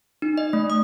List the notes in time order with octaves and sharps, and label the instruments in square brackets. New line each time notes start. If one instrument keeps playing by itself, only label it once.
[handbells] D#4
D#5
A3
D#6